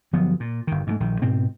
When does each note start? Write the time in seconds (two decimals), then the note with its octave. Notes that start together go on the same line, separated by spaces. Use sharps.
0.13 G1 F3 F#3 B3
0.40 A#2
0.67 G1 D#3
0.87 G#2 C#3 A3
1.00 A#1 D#3
1.22 G#2 B2 C4